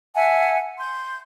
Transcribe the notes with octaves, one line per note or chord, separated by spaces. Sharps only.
E5 F#5 G#5 A5
C6 G6